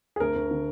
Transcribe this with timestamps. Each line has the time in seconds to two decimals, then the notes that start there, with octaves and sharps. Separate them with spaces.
0.16 G#4
0.20 D2 A#4
0.36 D2
0.51 D3